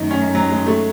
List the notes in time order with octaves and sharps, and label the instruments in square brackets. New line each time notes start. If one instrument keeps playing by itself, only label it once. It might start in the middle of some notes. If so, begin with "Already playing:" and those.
Already playing: [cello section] F#2 D#3 A3 [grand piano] D#4
[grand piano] C#4
F#3
G#3
A3